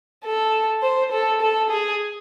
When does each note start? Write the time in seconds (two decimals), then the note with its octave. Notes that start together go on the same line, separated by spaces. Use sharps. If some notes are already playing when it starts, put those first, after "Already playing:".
0.25 A4
0.82 C5
1.12 A4
1.41 A4
1.70 G#4